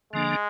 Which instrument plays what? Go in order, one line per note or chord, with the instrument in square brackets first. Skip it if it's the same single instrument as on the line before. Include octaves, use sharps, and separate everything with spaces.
[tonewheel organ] D3 F3 A#3 D4 [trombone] G#3